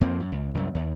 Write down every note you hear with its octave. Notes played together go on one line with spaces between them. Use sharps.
F2 F3 A#3 C4
F#2
C#2
C2 F#2
D#2